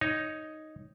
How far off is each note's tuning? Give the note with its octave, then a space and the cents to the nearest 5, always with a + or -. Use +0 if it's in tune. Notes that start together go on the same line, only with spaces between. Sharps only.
D#4 +0 C#5 +0